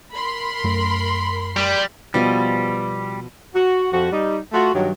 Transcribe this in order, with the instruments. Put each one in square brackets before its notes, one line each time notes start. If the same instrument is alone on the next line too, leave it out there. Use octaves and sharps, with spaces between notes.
[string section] A#4 B5 C6
[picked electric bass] F#2 A3
[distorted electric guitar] G3
[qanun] B2 F3 D#5 [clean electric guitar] G3
[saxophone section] F#4
F2 F3 F#4
G3 D#4
A3 F4 F#4
G2 D#3 F#3